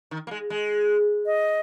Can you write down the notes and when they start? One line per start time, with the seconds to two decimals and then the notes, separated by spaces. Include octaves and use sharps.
0.11 D#3
0.27 A#3
0.31 G#3
0.50 G#3
1.26 D#5